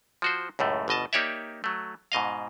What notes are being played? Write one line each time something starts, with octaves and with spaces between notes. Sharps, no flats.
F3 F#4 C5
C#2 F#2 A2 A3
G1 B2 D#5 A5
A#3 D#4 G4 C#5 D5 E5
F#3 A3
G#2 B2 D#5 F5